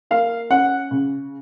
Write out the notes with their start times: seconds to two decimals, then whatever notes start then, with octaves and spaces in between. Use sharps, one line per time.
0.11 A#3 F5
0.50 C#4 F#5
0.91 C#3